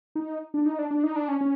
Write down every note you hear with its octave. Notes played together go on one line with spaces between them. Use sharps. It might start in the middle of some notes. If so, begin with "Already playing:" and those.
D#4
D4
D#4
D4
D4
D#4
D4
C#4
C#4